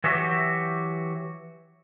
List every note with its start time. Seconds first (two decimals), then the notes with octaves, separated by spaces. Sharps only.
0.04 E3 F#3 F#4 G4 E5